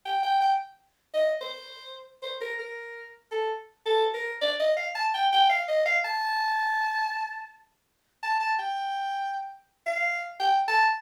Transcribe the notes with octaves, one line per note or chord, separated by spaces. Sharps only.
G5
G5
G5
D#5
C5
C5
A#4
A#4
A4
A4
A#4
D5
D#5
F5
A5
G5
G5
F5
D#5
F5
A5
A5
A5
G5
F5
G5
A5